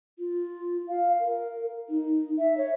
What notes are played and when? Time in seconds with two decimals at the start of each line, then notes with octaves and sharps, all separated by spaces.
0.19 F4
0.89 F5
1.21 A#4
1.89 D#4
2.38 E5
2.58 C#5